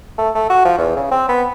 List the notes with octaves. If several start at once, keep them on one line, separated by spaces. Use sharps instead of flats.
A3
A3
F#4
F3
E2
C#3
C4
B3